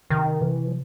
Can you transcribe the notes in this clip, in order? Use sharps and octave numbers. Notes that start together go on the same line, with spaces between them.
C3 D#3
C3 E3
F3